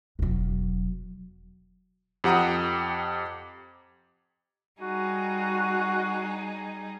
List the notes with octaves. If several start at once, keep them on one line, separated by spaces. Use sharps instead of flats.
E1 F#3
F2 G4 F#5 A#5 D#6
G3 D#4 F#4 G#4